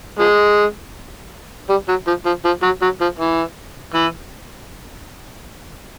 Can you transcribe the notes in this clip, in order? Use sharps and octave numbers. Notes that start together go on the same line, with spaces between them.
F3 G#3
G3
F#3
F3
F3
F3
F#3
F#3
F3
E3
E3